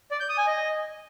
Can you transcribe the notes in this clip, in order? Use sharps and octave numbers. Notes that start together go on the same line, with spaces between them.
D5
G6
D#6
G#5
D#5